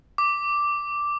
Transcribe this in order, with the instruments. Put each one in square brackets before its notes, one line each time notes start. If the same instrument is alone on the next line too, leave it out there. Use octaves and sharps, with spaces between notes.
[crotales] D6